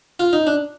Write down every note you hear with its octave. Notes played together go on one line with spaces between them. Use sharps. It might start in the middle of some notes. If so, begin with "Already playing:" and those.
F4
D#4
D4